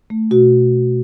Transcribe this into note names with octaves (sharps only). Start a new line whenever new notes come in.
A3
B2 F#4